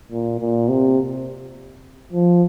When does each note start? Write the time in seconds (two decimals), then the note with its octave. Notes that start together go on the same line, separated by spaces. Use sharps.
0.12 A#2
0.40 A#2
0.68 C3
2.13 F3